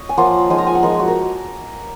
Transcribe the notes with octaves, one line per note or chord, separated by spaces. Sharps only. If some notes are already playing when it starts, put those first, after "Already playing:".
Already playing: C#5 D#5
G#5
F3 A#3 F4 F#5
F3 G#3 D#4 G#5
A#5
G#5
F#5
F3 G#3 D#4 A#4
F#4
A#4